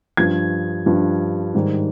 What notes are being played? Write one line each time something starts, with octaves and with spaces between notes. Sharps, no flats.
G2 F3 G#6
G2 F3
G#2 D#3 G3